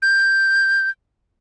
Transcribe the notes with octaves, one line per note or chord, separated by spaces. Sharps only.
G6